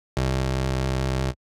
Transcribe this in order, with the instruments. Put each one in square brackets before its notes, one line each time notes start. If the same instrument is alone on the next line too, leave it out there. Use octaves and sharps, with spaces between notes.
[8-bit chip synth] C2